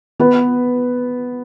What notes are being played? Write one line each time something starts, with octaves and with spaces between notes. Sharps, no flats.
B3 B4